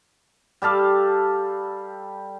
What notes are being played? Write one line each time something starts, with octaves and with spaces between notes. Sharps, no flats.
G3 G4 A4 F5